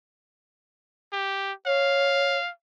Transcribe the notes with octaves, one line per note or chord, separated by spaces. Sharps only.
G4
C#5 F5